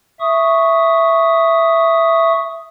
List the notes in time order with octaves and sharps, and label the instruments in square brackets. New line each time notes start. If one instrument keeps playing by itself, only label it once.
[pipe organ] E5 C#6 D#6